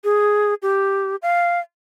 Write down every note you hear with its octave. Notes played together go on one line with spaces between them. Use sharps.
G#4
G4
F5